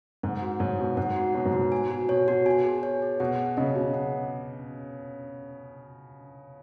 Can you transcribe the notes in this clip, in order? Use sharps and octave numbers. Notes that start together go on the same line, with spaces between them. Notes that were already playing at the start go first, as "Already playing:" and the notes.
G#2 F#5
F#4
G#2 C#5
B2 F#4
G#2 F#5
F#4
B2 C#5
G#2
B2 F#4
G#5
F#4
B2 C#5
B2 F#4
B2 G#5
G#4
C#5
G#4
B2 F#5
G#4
C#3 D#5
B2 G#4
F#5